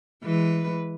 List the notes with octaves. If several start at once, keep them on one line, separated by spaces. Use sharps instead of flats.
E3 G#3 B4